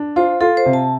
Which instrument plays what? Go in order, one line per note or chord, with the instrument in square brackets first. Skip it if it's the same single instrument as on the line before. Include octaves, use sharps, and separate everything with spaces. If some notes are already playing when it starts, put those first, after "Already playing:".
Already playing: [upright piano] D4
[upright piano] F4 [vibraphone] C5
[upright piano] F4 [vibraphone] A4
[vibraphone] C5
[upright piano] C3
[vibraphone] A5